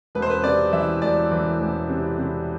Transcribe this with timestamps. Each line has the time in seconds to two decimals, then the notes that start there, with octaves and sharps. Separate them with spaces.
0.15 E1 B4
0.22 C5
0.30 B4
0.44 C3 D5
0.73 E3 E5
1.02 E1 D5
1.31 E3
1.60 E1
1.89 C3
2.19 C3